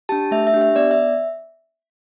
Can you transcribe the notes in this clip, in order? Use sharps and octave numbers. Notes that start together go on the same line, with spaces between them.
D4 G4 A5
A3 E5
E5
D4 G4
E5
B3 D5
E5